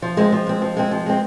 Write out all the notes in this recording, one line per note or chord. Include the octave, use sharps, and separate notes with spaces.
F3
G#3 C4
F3
G#3 C4
F3
G#3 C4
F3
G#3 C4